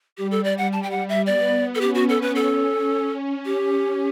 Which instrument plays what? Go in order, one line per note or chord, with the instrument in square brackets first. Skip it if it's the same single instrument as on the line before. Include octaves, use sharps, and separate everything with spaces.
[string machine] G3 [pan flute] G4
[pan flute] A4
D5
F#5
A5
G5
F#5
E5
[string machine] B3 [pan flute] D5
[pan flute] A4
[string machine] C#4 [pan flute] G4
[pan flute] F#4
A4
B4
[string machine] C#4 [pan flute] A4
[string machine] C#4
[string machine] C#4 [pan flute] G4